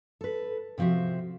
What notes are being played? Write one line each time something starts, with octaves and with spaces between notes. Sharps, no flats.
A4 B4
C3 F3 C4 F#4 E5